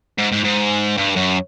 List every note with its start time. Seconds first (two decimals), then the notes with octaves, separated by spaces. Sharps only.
0.18 G#2
0.32 G#2
0.44 G#2
0.98 G2
1.16 F#2